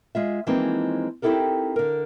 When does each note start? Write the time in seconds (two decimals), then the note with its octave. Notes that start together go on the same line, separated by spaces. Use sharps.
0.15 G#3 F4 E5
0.47 E3 F3 G#3 A#3 C4 D#4
1.22 C4 D#4 E4 G4 A4 A#4
1.76 D3 A#4